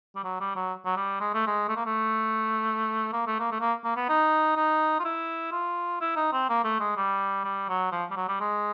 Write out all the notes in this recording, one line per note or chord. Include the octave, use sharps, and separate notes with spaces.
G3
F#3
G3
F#3
F#3
G3
G#3
A3
G#3
A3
A#3
A3
A#3
A3
A#3
A3
A#3
A#3
B3
D#4
D#4
F4
E4
F4
E4
D#4
C4
A#3
A3
G#3
G3
G3
F#3
F3
G3
F#3
G3
G#3